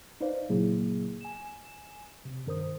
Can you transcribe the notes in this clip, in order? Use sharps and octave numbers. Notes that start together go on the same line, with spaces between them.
D#4 B4 C5 D5 D#5 F5
A#2 C#3 F#3 A#3 E4 G#4
G#5 E7
C3
G2 D#3 A#4 C5 D#6